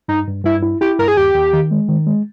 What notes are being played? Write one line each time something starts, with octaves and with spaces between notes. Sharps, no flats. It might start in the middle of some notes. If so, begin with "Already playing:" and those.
G2 D#4
G2
G2 E4
E4
E4 G4
G2 A#4
G#4
D#2 G4
D#2
D#3
G#3
D#3
G#3